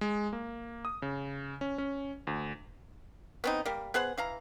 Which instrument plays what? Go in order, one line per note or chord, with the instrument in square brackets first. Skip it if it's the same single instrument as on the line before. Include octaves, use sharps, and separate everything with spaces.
[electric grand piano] G#3
A#3
D#6
C#3
C#4
C#4
D2
[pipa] B3 C4 D#4
G3 A#3
B3 G#4 C5 F#5
E3 F5 A#5